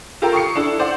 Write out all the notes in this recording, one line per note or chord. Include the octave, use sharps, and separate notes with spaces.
F4 G4 A4 A#4 G5
C#6 D#6 C7 C#7
D4 E4 A4
C5 D5 F#5